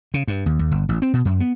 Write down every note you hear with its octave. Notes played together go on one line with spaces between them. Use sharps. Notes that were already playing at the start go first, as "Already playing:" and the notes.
C#3
G2
D#2
D#2
G1
A1
C4
B2
F#2
B3